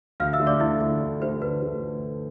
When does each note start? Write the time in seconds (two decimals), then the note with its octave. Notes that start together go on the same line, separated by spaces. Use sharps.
0.20 D2 F5 F6
0.33 E5 E6
0.40 D3 A3
0.47 D5 D6
0.60 D2 E4 E5
0.81 D3 A3
1.01 D2
1.21 D3 A3 C5
1.41 D2 B4
1.62 D3 A3